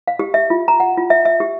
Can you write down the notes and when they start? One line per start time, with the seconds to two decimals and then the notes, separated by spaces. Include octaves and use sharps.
0.08 F5
0.19 G4
0.34 E5
0.50 F4
0.68 A#5
0.80 F#5
0.98 F4
1.10 E5
1.25 E5
1.40 G4